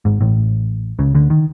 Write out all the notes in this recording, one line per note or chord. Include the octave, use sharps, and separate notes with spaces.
G#1 G#2
A1 A2
C#2 C#3
D2 D3
D#3